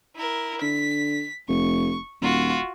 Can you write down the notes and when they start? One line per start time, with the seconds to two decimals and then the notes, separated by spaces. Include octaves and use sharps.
0.16 E4 A#4
0.62 D3 B6
1.49 F1 C#6
2.22 D#1 F4 F#4